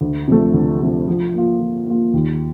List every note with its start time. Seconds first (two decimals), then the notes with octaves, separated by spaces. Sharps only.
0.01 D2
0.28 C3 F3 A3
0.54 D2
0.81 C3 F3 A3
1.08 F3
1.34 A#3 F4
1.60 F3
1.87 A#3 F4
2.13 D#2